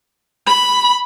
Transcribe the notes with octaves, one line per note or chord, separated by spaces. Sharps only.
B5